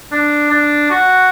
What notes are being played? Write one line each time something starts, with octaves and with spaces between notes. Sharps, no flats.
D4
D4
F#4